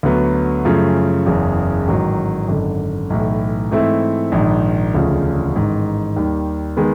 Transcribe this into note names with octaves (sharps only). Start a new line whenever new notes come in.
D2 D3 F#3 B3
F#2 C#3 F3 A3
F#1 E2 C#3
A1 G#2 D#3 F#3
G#1 F#2 D3
B1 A2 E3
G#2 E3 A3 C4 E4
A#1 G#2 D#3
E1 D2 C#3 F3
A1 G#2 D#3
D#2 D#3 G3
D#3 G#3 B3